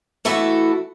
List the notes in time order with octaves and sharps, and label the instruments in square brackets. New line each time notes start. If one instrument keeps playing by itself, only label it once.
[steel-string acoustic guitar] E3 A3 E4 F#4 A4